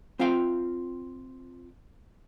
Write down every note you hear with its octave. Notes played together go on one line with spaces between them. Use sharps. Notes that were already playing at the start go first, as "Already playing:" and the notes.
C4 F4 E5 F5 G5